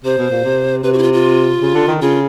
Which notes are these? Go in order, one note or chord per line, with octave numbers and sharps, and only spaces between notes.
C3 C5
B2
A#2
C3
C3 B4
F#4
E4
F4
F4
C#3
D3
D#3
C#3 F4